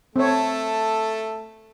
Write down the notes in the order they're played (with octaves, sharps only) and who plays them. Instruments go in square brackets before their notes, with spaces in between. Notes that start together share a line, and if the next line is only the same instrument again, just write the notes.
[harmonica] A3 A4 [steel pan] C4 C#5